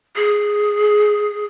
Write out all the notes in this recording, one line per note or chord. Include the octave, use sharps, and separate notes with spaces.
G#4